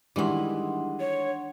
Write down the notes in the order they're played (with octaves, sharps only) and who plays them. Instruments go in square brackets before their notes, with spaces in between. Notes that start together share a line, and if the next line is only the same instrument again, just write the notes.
[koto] D#3 E3 [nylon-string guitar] G3 G#3 E4 [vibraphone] D4 F#5 C6
[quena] C#5